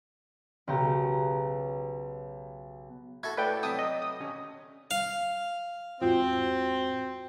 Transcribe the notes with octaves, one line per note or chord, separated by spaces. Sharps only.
B1 C#3 G4 A#5
E4 F#4 A4 G#6
A2 F#4 A4 B4 D5 G5
C3 F#3 D4 D#6 E6 B6
D#5
D#6
D#1 C#4
F5
E2 G#2 C4 F4 F#4